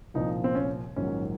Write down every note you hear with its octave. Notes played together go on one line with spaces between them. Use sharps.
C2 A#2 F3 D#4
C4
C#4
A#1 G#2 D#3 F#3 C#4